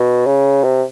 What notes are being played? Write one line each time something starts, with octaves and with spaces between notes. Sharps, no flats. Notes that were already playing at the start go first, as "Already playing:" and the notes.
Already playing: B2
C#3
C3